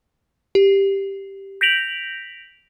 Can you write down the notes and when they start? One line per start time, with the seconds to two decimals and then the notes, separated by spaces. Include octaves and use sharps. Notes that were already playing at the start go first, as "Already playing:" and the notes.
0.55 G4
1.61 G6 A#6 B6 D7 F7 F#7